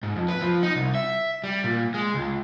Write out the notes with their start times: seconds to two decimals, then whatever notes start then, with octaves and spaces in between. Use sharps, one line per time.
0.03 G#2
0.16 F2
0.28 B4
0.42 F3
0.63 D#4
0.75 C2
0.95 E5
1.44 G3
1.64 A#2
1.94 G#3
2.14 C#2